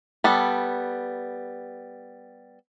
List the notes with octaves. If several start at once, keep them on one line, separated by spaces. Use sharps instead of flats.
G3 B3 A4